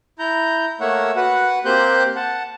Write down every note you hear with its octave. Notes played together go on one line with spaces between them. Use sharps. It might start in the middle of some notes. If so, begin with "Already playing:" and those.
E4 A#5 G6
A3 A#3 C#5 E5 F#5
F#4 B4 F#5
A#3 C4 G4 C5 F#6 G6
F#5 A5